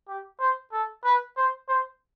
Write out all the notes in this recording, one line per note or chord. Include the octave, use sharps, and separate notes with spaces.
G4
C5
A4
B4
C5
C5